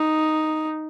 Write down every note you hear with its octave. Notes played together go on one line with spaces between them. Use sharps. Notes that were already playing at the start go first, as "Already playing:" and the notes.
Already playing: D#4